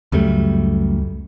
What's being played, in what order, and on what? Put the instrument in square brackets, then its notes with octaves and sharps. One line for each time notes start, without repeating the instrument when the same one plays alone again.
[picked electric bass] C#2 F#2 G3 A3